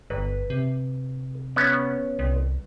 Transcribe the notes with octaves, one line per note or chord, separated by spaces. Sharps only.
G1 B4
C3
B3 C#4
C2